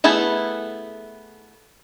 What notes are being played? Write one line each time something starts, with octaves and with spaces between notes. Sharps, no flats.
A3 B3 E4 G#4 A4